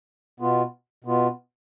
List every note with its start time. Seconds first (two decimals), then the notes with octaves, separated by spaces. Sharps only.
0.40 B2 B3 F4
1.04 B2 B3 F4